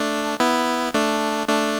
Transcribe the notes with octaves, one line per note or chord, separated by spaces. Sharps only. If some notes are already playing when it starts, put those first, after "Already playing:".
Already playing: A3 D4
B3 E4
A3 D4
A3 D4